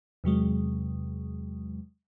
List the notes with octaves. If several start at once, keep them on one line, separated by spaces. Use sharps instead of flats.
E2 C3 F#3 G#3